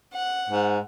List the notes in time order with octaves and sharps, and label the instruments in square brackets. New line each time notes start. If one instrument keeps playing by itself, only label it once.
[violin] F#5
[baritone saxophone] G#2